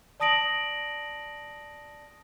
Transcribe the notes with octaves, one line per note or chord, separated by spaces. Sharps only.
D5 A5 D#6 A#6 D7 F#7